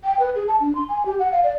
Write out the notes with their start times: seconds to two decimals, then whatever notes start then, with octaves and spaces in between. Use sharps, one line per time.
0.04 G5
0.19 B4
0.35 G#4
0.48 A5
0.60 D4
0.75 C6
0.89 G#5
1.06 G4
1.19 F#5
1.32 F5
1.44 D5